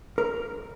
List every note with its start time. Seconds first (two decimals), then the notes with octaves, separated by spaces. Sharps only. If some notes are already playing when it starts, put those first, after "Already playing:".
0.18 A#4